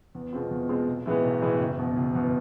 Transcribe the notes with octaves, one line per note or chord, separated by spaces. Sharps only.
E2
B2 G#3 C4 F4
E2
B2 G#3 C4 F4
B1
A2 E3 G#3 B3
B1
A2 E3 G#3 B3
F#1
E2 B2
F#1
E2 B2